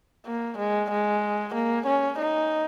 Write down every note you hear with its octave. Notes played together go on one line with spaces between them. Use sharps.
A#3
G#3
G#3
A#3
C#4
D#4